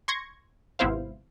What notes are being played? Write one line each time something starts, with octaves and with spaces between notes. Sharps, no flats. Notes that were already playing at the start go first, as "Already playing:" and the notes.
C6 C#6 G#6 A#6 C#7
G#1 C3 B3 E4 C5 F5